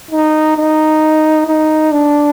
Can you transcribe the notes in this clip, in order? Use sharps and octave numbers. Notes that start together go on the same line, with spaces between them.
D#4
D#4
D#4
D4